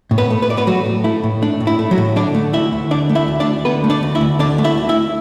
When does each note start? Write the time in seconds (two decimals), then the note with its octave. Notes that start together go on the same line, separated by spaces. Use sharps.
0.11 A2
0.18 B3 B4
0.30 A3
0.42 B4
0.49 A2 D5
0.57 B3 B4
0.67 F#3 A3 F#4
0.86 A2
1.04 A3 E4
1.24 A2
1.42 A3 D4
1.60 A2
1.67 E4
1.79 A3
1.91 F#3 F#4
1.98 A2
2.16 D3 D4 D5
2.35 A3
2.53 D2 E4 E5
2.72 D2
2.91 D3 D4 D5
3.09 A3
3.15 E4 E5
3.28 D2
3.40 D4 D5
3.47 D2
3.65 D3 B3 B4
3.84 A3
3.90 D4 D5
4.03 D2
4.15 E4 E5
4.21 D2
4.39 D3 D4 D5
4.58 A3
4.64 E4 E5
4.78 D2
4.89 E4 E5